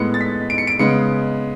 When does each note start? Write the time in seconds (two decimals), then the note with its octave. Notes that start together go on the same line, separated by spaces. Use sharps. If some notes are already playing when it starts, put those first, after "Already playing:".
Already playing: A2 G#3 B3 C#7
0.14 A6
0.21 B6
0.50 D7
0.58 C#7
0.67 D7
0.79 C#3 G#3 B3 C#7